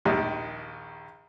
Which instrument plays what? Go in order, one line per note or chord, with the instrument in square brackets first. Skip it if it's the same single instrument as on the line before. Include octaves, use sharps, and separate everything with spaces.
[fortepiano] A#1 D#2 D#3 G3